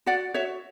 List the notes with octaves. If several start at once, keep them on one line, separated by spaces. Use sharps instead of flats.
F#4 D5 F#5
F#4 C#5 E5